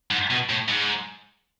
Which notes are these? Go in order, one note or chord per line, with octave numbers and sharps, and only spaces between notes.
G#2
B2
A2
G#2